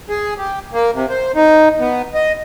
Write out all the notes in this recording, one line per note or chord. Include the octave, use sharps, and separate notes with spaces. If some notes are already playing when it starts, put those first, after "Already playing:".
G#4
G4
A#3
C3
C5
D#4
B3
D#5